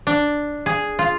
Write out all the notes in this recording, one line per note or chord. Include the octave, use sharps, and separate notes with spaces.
D4
G#4
F4